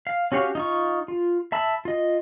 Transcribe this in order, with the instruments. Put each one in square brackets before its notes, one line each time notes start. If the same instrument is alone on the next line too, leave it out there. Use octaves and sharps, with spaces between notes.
[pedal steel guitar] F5
C#4 F#4 G4 C#5 F5
D#4 F4 C#6
F4
E5 A5 B5 E6
F4 D#5